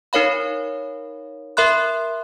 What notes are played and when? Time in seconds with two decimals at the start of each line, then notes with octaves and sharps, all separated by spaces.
0.13 D#4 A#4 C#5 F5 B5
1.57 A#4 E5 B5 C6 F#6